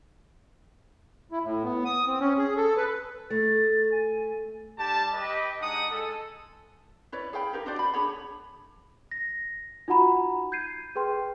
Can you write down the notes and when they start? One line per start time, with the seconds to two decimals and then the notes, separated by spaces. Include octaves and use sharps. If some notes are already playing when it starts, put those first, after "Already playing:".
1.31 E4
1.44 A2
1.64 B3
1.85 D#6
2.07 C4
2.20 C#4
2.38 G#4
2.57 A4
2.77 B4
3.30 A3 A6
3.92 G#5
4.78 G3 D4 G4 A5
5.14 G4 B4 D#5
5.62 G#3 D4 D#4 F#5 D#6
5.91 G#3 A4
7.12 E4 B4 C#5 D5
7.33 G#4 F5 G5 B5
7.53 D#4 G4 A#4 B4
7.66 D4 F#4 C5 D5
7.79 B5
7.94 D4 G#4 C#5 B5
9.11 A#6
9.88 D#4 F4 F#4 F#5 A#5 B5
10.52 G6 G#6 C7 D#7
10.96 G#4 B4 G5 C6